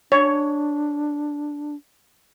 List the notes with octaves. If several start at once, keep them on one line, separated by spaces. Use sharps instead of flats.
D4 C#5